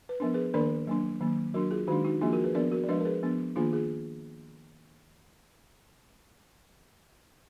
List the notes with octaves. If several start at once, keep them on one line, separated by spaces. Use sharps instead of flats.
B4
F3 B3 D4 A#4
G#4 B4
D#3 A#3 D4 A#4 D5
F#3 A#3 D4
D#3 F#3 A#3
F#3 D4 F#4 A#4
F4 G#4
D#3 G#3 D4 D#4 F#4
D#4 F#4
F3 A#3 D4 F4 G#4
F#4 A#4
G#4 B4
F3 B3 D4 A#4 D5
F#4 A#4
D5
F3 G#3 D4 B4 D#5
A#4
G#4 B4
F3 B3 D4
D#3 A#3 D4 F4 G#4
F4 G#4